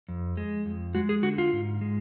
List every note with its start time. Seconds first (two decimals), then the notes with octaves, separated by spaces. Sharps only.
0.08 F2
0.37 G#3
0.66 F2
0.95 G#3 F#4
1.09 G#4
1.23 D3 F#4
1.38 F4
1.53 G#2
1.81 G#3